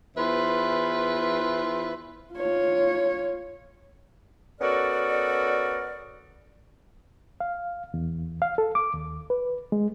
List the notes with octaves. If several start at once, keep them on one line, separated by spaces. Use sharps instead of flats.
E2 F4 B4 C5 E5
F4 C#5
B3 C#4 F#4 A4 A#4 D5
F5
E2
F5
A4
D6
D#2
B4
G#3